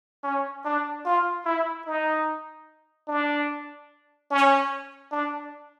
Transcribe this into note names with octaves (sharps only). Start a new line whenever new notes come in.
C#4
D4
F4
E4
D#4
D4
C#4
D4